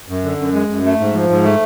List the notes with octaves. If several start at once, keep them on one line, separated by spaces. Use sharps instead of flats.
F#2
D3
F#2
G#3
F#2
A3
G#2
F3
G#2
A3